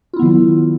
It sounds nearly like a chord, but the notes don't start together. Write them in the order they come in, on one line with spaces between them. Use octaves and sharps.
F4 E4 B3 D#3 F#3